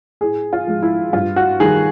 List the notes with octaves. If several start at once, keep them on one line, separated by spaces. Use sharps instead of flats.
A2 G#4
F4
F3 G#3
E4
G2 F4
F#4
D#3 G3 G#4